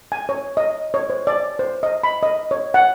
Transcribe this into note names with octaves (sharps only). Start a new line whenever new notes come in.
G#5
C#5
D#5
C#5
C5
D5
C5
D#5
B5
D#5
C#5
F#5